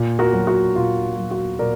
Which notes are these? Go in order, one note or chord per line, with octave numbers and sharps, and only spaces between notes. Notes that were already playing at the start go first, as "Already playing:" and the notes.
Already playing: A#2
F#4 A#4
F#3
F#4
A#2 F4
F#3
F#4
A#2 A#4 D5